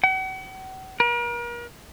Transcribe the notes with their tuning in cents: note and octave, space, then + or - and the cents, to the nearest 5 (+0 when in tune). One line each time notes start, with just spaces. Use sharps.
F#5 +40
A#4 +40